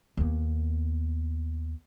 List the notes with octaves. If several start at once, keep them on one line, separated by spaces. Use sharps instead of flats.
D#2 B3